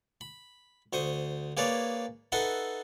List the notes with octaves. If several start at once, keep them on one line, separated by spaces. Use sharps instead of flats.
B5
D2 C5 C#6 D#6
A#3 G#4 B4 C#5 D5
D#4 A4 B4 E5 F#5 C6